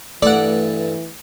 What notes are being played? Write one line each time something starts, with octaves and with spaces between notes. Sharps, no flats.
G2 E3 A3 A4 D5 F#5